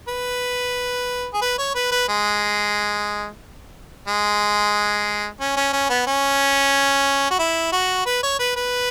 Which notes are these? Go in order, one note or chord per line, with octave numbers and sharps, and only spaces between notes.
B4
G#4
B4
C#5
B4
B4
G#3
G#3
C#4
C#4
C#4
B3
C#4
F#4
E4
F#4
B4
C#5
B4
B4